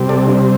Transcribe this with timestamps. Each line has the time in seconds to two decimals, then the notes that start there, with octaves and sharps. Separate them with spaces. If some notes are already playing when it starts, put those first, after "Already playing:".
Already playing: C3 G3 C4
0.09 A4 D5
0.27 D4